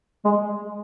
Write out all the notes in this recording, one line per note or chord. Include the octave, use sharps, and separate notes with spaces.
G#3